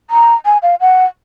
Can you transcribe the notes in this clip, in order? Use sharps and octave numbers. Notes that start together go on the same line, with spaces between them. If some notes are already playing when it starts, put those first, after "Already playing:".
A#5
G#5
F5
F#5